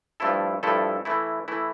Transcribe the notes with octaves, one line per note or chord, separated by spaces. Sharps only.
G2 F3 A3 E4 A4
G2 F3 A3 E4 A4
E3 A3 E4
E3 A3 E4